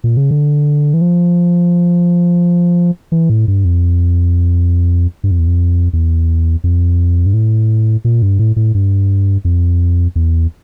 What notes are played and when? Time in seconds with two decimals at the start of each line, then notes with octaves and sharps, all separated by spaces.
0.04 A#2
0.17 C#3
0.31 D3
0.94 E3
1.01 F3
3.12 E3
3.30 A2
3.48 G2
3.65 F2
5.24 G2
5.31 F2
5.39 E2
5.47 F2
5.93 E2
6.64 F2
7.26 G2
7.34 A2
8.05 A#2
8.22 G2
8.39 A2
8.56 A2
8.74 G2
9.45 F2
10.16 E2